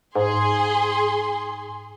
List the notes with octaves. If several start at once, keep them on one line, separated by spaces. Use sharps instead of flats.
G#2 G#4 C6